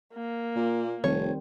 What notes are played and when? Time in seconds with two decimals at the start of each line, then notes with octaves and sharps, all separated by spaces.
0.14 A#3
0.56 A#2
1.04 F1 D#3 G3 C4 C#5